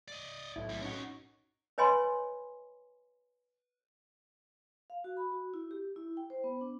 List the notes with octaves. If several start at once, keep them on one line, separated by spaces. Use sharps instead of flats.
D5 D#5
B1 A2 E4
F2 G3
C#4 D#4 F#4 A#4 C#5
B4 C#5 D#5 G#5 B5 C6
F5
F#4
B5
F#4
E4
G4
E4
G5
C5
B3
D4